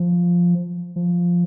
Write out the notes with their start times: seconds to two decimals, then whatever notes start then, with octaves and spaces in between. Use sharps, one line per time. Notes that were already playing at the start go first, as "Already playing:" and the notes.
Already playing: F3
0.96 F3